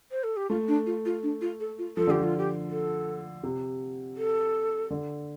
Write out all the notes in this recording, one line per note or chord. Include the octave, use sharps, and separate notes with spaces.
C5
A4
G4
A3 F4
D4
F4
F4
D4
F4
A4
F4
F3 A4
D3 G4
F3
F4
G4
A4
C3
A4
D3